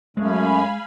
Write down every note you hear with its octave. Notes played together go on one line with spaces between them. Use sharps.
F#2 G#3 A3 F5 G#5 B5